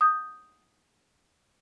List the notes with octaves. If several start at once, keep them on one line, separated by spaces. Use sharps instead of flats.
D#6 G6